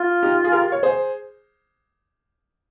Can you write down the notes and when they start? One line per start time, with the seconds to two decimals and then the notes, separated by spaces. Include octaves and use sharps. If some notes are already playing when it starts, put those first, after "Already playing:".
Already playing: F4
0.23 D#4 G4
0.44 G#4
0.52 G4 A#4
0.72 C#5
0.83 G#4 C5